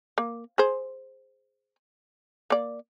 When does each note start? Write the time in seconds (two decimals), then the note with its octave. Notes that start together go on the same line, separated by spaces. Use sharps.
0.18 A#3
0.58 G#4 C5
2.50 A#3 D5